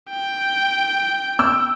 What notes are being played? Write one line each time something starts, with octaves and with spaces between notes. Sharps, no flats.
G5
E6